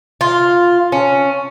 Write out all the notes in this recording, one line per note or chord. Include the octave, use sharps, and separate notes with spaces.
F4
C#4